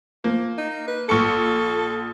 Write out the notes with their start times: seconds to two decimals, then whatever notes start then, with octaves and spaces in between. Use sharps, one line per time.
0.24 F3 A#3
0.58 D#4
0.88 B4
1.09 A#1 A4 C#6 C#7